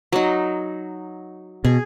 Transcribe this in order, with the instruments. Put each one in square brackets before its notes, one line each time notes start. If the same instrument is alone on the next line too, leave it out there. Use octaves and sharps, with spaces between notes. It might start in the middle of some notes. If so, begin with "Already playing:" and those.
[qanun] F#3 D#4
[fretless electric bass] B2 [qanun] G#4